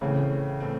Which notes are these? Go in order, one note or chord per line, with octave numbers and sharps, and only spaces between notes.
A2 C#3 E3 A3 C4
A2 E3 A3 C4